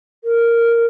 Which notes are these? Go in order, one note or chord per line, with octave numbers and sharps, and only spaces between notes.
A#4